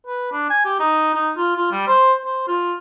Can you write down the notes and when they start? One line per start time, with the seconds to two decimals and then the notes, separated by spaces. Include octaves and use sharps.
0.07 B4
0.32 D4
0.50 G#5
0.65 G4
0.80 D#4
1.14 D#4
1.37 F4
1.56 F4
1.72 G3
1.87 C5
2.24 C5
2.48 F4